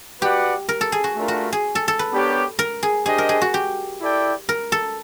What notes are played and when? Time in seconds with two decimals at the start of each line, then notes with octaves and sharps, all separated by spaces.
0.22 F#4 G4 B4 D5 F#5
0.69 A#4
0.81 A4
0.92 G#4
1.04 F#4
1.17 A3 D4 F4 A#4
1.28 F#4
1.53 G#4
1.75 A4
1.88 A4
1.99 B4
2.11 B3 D4 G4 A#4 C#5
2.59 A#4
2.83 G#4
3.06 D4 G4 G#4 C5 D#5
3.18 A#4
3.29 G#4
3.41 F#4
3.54 G4
4.00 E4 A4 D5 G5
4.49 A#4
4.72 A4